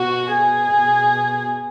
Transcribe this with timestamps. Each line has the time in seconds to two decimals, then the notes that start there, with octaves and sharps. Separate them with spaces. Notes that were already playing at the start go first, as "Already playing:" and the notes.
Already playing: B2 F#4
0.32 G#4
0.75 B2